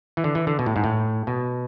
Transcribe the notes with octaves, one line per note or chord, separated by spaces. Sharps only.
E3
D3
E3
D3
B2
A2
G#2
A2
B2